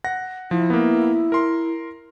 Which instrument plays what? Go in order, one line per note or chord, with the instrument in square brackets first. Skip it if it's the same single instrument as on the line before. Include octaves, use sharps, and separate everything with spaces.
[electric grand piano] F#5 A#6
[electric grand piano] F3 [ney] E4
[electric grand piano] A#3 B3
A#4 C6